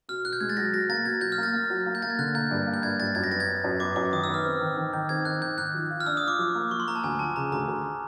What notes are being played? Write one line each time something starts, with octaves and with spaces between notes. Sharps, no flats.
B2 F6
B2 F#6
G6
G#3 G#6
A6
F#3 A#6
B2 A#6
A#3 A6
B2 G#6
F#3 G6
F6
A#3
A6
A#3
F#3
A#3
G6
A#3 A6
G#6
D3 F#6
A#3 G6
G2
A#3
G6
G2 G#6
G2 A6
F#2 G#6
A#6
B3 A6
G#6
B3
F#2
B3 D6
F#2 D6
D#3 D#6
E6
B3
F6
C4
D#3
D#3
D#3 G6
C4 G#6
D#3 F#6
D#3 G6
D#3 F#6
F3
F4
F6
D4 E6
D#6
F4 D6
F3
A#3
F3 C#6
C6
A#3 A#5
A5
D2 G#5
F3 A5
C#3 A#5
D2 A#5
D2